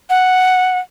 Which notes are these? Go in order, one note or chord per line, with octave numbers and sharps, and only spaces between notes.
F#5